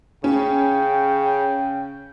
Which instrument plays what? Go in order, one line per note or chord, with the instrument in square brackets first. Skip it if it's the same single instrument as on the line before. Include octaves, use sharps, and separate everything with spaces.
[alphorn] C#3 [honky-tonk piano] C#4 [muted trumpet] G5